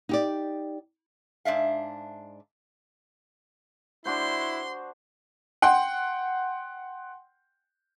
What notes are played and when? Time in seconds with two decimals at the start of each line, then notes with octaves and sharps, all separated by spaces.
0.09 D#4 G4 D5
1.45 G#2 D4 E5 F5
4.06 D4 E4 F#4 C5 C6
5.62 F#5 G5 C6